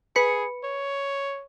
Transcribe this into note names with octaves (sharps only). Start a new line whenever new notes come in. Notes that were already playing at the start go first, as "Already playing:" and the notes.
G#4 B4 B5 C#7
C#5